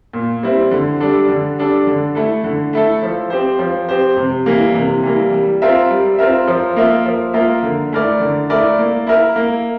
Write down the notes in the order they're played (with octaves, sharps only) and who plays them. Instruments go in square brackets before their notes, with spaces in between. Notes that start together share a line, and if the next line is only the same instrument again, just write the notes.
[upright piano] A#2
G3 C4 E4
D3
G3 D4 A4
D3
G3 D4 A4
D3
A3 E4 A4
D3
A3 E4 A4
F3
C4 G4 C5
F3
C4 G4 C5
C3
E3 G3 A#3
C3
E3 G3 A#3
G3
C4 F4 A#4 E5
G3
C4 F4 A#4 E5
F3
A#3 F4 A#4 E5
F3
A#3 F4 A#4 E5
D3
A3 E4 A#4 D5
D3
A3 E4 A#4 D5
A#3
E4 A#4 E5
A#3